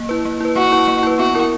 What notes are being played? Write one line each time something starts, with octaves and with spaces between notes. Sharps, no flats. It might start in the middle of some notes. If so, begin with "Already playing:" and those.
Already playing: A#3
E4 B4
A#3
E4 B4
A#3 F#4
E4 B4
A#3
E4 B4
B3 F#4
E4 A#4